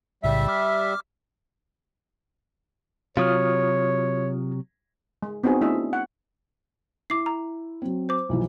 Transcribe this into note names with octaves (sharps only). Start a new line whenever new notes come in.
B1 A2 C#3 G3 E5
D6 F6
C3 F#3 F4 C#5 D#6 F6
G#3
B3 C4 D#4 F#4 G#4
A3 D4 E4 G#4 D#5 E5
F#4
F#5
E4 D6 C7
A#5
F#3 C4
C5 D6
B1 E3 F3